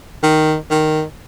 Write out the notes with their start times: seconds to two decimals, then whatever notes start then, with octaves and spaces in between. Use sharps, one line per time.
0.23 D#3
0.70 D#3